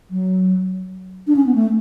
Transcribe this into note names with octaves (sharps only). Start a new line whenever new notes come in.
F#3
D4
C#4
B3
A3